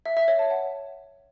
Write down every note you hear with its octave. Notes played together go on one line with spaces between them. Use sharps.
E5
E5
C#5
A5
F#5